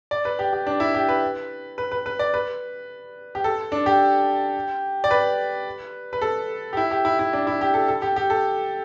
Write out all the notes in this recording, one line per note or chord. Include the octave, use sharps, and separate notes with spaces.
D5
B4
G4
G4
D4
E4
G4
B4
B4
B4
B4
D5
B4
G4
A4
D4
G4
D5
B4
B4
A4
G4
E4
G4
E4
E4
D4
E4
G4
A4
A4
G4
G4
A4